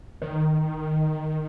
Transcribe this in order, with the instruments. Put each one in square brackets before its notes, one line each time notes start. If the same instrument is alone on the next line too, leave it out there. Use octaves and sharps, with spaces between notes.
[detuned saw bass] D#3